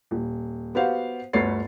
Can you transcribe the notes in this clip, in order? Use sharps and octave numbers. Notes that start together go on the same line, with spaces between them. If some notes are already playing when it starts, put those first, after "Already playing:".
D#1
B3 F#4 G4 C5 F5 F#5
G1 D2 B3 C#5 A6 C7